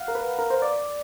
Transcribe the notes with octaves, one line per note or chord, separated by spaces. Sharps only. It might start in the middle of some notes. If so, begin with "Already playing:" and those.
Already playing: F5 F#5
A#4
B4
A#4
C5
D5